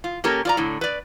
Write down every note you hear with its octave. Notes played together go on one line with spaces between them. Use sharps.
F4
A#3 C#4 G4 A4 A#4
F4 D5 A#5
A2 D3
B4 D5